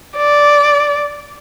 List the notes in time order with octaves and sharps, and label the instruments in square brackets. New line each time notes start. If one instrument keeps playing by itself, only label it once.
[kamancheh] D5